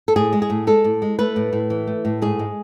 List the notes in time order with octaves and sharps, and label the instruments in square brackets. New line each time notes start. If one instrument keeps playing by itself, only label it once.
[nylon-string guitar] A4
A2 G#4
G#3
G#4
A2
G#3 A4
A2
G#3
A3 B4
A2
A2
E3
A3
A2
G#2 G#4
G#3